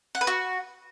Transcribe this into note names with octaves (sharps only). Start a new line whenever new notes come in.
F#5
B4
F#4